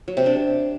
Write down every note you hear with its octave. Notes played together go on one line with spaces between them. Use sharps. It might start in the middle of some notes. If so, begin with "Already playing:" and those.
F#3
C3
D4